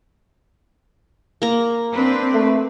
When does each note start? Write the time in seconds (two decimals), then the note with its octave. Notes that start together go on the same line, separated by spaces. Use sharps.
1.42 A#3 A#5
1.94 C4 D4 B4
2.33 A3